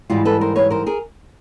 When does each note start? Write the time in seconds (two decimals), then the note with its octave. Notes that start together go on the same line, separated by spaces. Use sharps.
0.10 G#2 E3 G3 F4 G4
0.25 A4 B4
0.41 A#4 C5
0.56 B4 C#5
0.70 A#4 C5
0.86 G#4 A#4